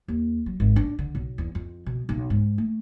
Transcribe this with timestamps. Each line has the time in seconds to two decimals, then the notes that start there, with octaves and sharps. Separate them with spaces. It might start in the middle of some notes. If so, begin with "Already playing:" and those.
0.08 D#2
0.46 F#3
0.60 G#1
0.76 D4
0.99 D3
1.15 B1
1.38 E2
1.55 F2
1.86 B2
2.09 B1
2.30 G#2
2.58 A3